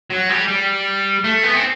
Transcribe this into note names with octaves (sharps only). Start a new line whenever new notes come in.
F#3
G3
G3
A3
B3
C4